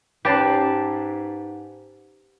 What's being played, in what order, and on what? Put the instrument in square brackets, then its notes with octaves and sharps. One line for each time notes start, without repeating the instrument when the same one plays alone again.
[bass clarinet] G#2 [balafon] C#4 C#5 D6 [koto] G4 [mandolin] B4 A5